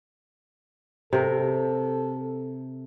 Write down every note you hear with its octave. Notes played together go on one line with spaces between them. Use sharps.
C3 A4 A#4